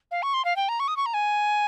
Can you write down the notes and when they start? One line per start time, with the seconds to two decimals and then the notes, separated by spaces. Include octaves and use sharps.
0.11 F5
0.23 C#6
0.34 C6
0.45 F5
0.56 G5
0.69 A#5
0.80 C#6
0.88 D#6
0.97 C#6
1.06 A#5
1.14 G#5